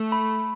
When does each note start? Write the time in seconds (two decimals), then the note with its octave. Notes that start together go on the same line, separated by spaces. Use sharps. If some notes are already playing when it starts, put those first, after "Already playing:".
Already playing: A3
0.12 B5